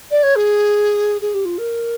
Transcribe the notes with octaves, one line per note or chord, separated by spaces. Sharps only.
D5
C#5
G#4
G#4
G4
F4
A#4